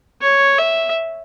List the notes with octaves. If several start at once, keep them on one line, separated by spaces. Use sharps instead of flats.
C#5
E5